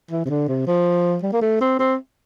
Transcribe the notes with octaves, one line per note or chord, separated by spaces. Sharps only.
E3
C3
D3
C3
F3
G3
A#3
A3
C4
C4